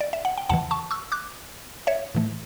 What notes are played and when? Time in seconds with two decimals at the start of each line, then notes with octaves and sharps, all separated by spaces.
0.01 D5
0.13 E5
0.25 F#5
0.38 G5
0.49 E2 C#3 E3 F#5 A5
0.71 A5 C#6
0.91 C#6 E6
1.12 D6 F#6
1.87 C#5 E5
2.15 A2 E3 A3